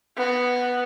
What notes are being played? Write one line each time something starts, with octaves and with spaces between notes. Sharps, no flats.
B3